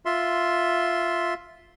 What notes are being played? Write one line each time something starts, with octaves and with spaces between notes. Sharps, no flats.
F4 E5 C6